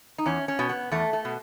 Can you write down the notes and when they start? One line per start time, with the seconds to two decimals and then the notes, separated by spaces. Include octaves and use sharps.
0.18 D#4
0.26 E2 C#4
0.48 C#4
0.59 B2
0.69 B3
0.91 E2 A3
1.13 A3
1.25 B2